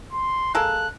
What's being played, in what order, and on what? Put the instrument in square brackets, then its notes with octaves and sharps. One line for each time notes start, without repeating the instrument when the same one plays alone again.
[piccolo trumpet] C6
[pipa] G#3 A#3 A4 [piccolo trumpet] F#6